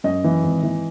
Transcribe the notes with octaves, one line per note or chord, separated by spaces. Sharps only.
F#2 D#5
E3
G#1
E3